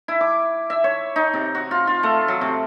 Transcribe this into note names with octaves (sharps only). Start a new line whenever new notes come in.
E4
D6
E5
C#5
D#4
C3
F#4
F4
F4
A3
F#3
C3